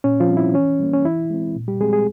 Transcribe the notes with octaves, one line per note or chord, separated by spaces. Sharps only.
A#2 C#4
F3 F4
G3 C4
E4
E3 C#4
G3 A#3
C#4
E3 E4
G#3 C4
A#2
G3 G4
F3 G#3 C4 G#4
G#3 G#4